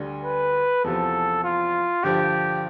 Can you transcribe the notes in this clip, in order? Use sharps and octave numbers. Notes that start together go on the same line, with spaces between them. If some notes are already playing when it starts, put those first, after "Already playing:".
Already playing: D2 D3 G3
B4
E2 C3 F3 A4
F4
G2 D3 F3 G4